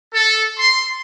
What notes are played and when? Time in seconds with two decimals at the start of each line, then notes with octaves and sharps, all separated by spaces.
0.14 A4
0.60 C6